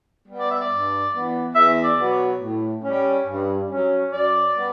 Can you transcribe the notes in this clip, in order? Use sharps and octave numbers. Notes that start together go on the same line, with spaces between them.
G3 B3
D5
E5
D5
G2
E3 B3
E2 E5
D5
B2 F#3 B3
C#5
A2
G3 C#4
G2
F#3 C#4
F#2 D5
G3 B3